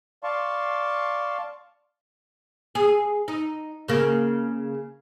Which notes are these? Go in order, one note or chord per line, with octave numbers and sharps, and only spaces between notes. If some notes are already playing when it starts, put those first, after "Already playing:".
D5 F5 A5 C6 C#6
G#4
D#4
C#3 A#3